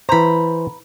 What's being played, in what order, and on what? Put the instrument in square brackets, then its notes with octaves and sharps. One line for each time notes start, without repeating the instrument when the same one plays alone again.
[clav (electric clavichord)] E3 C5 [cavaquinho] A#5 B5